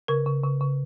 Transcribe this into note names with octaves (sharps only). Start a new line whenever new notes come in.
C#3 A#4
C#3
C#3
C#3